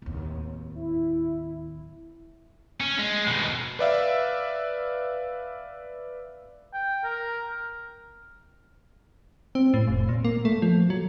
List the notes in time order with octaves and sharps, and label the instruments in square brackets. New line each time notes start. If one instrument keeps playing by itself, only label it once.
[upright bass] D1 D#2
[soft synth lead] E4
[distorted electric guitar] C#4
G#3
D#2 B2
[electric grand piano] B4 D5 E5 F5
[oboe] G5
A#4
[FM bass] C4
A2
F1
A#2
A#3
A3
F3
F#3